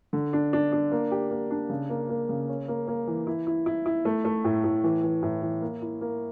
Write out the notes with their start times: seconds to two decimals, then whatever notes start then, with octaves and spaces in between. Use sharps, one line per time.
0.13 D3
0.33 D4
0.53 D4
0.72 D4
0.92 A#3
1.11 G4
1.31 A#3
1.51 D4
1.70 C#3
1.89 A#3
2.09 A#3
2.29 C#3
2.49 C#4
2.68 A#3
2.88 A#3
3.07 E3
3.27 E4
3.47 E4
3.66 E4
3.86 E4
4.05 A3
4.25 A3
4.44 A2
4.64 A2
4.84 E3
5.03 E3
5.23 A2
5.42 E3
5.62 A#3
5.82 E4
6.01 A#3